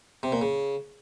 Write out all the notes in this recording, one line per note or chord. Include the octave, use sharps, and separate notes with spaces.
C3
A#2
C#3